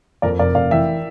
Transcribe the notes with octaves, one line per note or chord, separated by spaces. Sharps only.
F2 A#4 D5
F1 A#4 D5
F1 D5 F5
E3 E5 G5